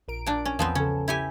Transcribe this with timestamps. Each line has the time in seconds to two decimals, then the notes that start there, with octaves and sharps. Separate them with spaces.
0.08 A#1 A#4 D7
0.26 A#2 D4
0.45 C#4
0.59 E2 F3 B3 C4
0.75 C#3 C#4 A4
1.08 E4 G4 G#5